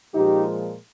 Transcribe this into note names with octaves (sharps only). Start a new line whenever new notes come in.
A#2 F3 G#3 D#4 G4